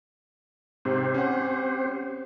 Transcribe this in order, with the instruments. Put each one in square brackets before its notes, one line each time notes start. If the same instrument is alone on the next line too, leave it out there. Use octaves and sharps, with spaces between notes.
[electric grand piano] G#2 C3 [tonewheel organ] C4 G4 C5
[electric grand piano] C#4 F#5